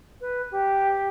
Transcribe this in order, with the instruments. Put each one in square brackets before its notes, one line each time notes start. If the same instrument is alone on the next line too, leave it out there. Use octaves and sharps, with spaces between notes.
[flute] B4
G4